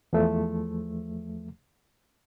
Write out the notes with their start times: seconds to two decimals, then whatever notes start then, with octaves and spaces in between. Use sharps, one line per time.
0.13 E2 F3 A3